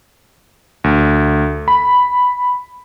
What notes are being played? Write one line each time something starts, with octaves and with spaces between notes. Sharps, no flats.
D2
B5